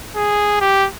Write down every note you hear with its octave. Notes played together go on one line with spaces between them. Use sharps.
G#4
G4